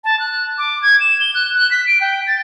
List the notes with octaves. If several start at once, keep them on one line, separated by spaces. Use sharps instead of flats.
A5
F#6
D6
G#6
E7
G7
F#6
F#6
B6
D7
G5
A6